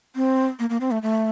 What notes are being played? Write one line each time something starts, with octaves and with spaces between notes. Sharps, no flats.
C4
A#3
A#3
C4
A3
A3